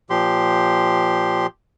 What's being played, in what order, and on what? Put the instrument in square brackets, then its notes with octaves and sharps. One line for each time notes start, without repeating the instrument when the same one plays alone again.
[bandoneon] A#2 F3 G4 C6